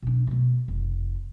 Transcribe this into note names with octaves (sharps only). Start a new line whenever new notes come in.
B2 D4
B2 A3
F1